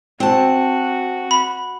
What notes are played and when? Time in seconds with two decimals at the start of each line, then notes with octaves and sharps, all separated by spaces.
0.20 C4 F#4 A5
1.31 B5